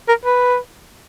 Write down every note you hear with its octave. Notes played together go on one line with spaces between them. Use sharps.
A#4
B4